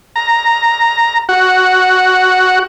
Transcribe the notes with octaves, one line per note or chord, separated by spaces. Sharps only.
A#5
F#4